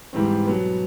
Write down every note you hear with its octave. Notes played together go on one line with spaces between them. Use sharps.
G#2 E3 G3 C4
B2 F#3 B3